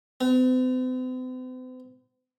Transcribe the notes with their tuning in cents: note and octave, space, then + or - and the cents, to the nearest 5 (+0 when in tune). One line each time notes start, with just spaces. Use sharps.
C4 -45